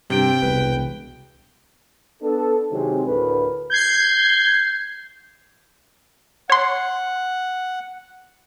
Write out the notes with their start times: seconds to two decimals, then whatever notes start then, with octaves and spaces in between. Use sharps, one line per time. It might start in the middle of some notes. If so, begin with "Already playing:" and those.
0.10 G2 C3 G5 D7
0.42 E1 C2 B4
2.22 B3 D4 A4
2.71 C3 D#3 F#3 G#3 C4
3.06 D2 A2 A#4 B4
3.70 G6 G#6 C7
6.50 C#5 F#5 C6